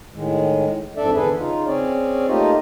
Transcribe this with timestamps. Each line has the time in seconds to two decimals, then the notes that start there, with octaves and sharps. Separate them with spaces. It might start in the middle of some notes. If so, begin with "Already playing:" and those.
0.14 A2 D#3 G#3
0.96 F2 G#2 D4 A4 D5 E5
1.14 E2 D3 G#4 A4 B4
1.38 C#3 D#4 F4
1.67 C4 C#4 G#4 C#5 D5
2.28 A3 A#3 D#4 F4 G4 D#5